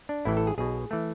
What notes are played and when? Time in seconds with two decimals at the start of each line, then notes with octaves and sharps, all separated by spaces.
0.09 D4
0.25 A1 A2 E3 E4
0.37 A4
0.47 G#4
0.58 B1 B2 G#4
0.91 E3 A3